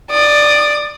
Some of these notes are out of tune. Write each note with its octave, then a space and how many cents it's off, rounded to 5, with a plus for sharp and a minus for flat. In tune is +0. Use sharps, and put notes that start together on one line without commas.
D5 +5 D#6 -25